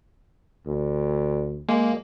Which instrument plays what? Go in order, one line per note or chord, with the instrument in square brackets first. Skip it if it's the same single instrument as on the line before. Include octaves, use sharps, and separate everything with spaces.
[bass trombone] D2
[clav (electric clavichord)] G#3 [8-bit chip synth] A#3